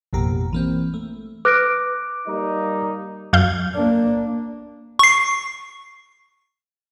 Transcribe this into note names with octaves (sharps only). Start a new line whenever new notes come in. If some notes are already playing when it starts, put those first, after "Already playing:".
A1 F2 B2 A#3 G4 A#5
E3 A#3 C4
A3
B4 D6 F#6 A#6 D7
G3 A#3 D#4
F#2 F5 G6
A#3 D4
C#6 C7